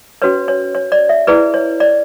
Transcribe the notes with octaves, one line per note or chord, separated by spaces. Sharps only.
C#4 F#4 B4 C#5
C#5
C#5
D5
E5
E4 G#4 B4 D5
C#5
D5